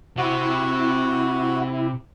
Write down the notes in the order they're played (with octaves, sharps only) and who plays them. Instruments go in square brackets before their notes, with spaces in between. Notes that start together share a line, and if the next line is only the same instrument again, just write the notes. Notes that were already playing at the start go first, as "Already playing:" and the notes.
[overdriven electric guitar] C3 [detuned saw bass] E4 [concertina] F#4